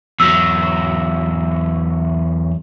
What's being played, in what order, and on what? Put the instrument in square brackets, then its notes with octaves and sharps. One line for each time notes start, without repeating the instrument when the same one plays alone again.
[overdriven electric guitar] E2 F#3 [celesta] E6